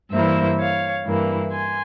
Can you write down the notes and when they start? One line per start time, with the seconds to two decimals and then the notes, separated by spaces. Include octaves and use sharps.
0.12 G2 E3 A#3 E4 C5 E5
0.59 C#5 F5
1.06 G2 E3 A#3 E4
1.52 G#5 C6